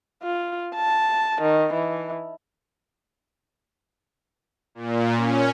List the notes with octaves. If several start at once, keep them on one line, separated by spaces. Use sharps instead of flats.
F4
A5
D#3
E3
A#2
C#4